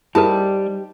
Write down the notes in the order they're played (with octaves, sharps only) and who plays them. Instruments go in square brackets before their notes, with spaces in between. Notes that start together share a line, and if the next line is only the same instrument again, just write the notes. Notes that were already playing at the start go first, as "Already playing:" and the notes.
[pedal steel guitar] G3 [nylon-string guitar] D#4 G4 C5 [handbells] E4 G#4 A#4 [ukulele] A5